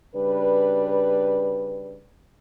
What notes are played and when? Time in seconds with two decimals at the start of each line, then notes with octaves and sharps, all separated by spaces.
0.16 C#3 G3 D4 B4